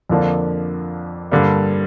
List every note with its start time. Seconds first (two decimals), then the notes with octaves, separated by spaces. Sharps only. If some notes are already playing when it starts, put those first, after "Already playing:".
0.09 F2 D3 F3 A#3 D4
1.31 G2 D3 G3 A#3